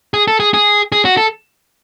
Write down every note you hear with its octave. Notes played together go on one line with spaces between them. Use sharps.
G#4
A4
G#4
G#4
G#4
F#4
A4